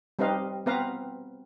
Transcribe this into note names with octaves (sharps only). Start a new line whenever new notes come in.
G3 C4 D#4 B4 D#5 F5
B3 C4 B4 F5 A#5